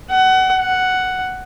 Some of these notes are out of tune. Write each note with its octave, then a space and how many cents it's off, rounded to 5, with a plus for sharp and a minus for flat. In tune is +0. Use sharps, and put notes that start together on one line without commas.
F#5 +25
F#5 +5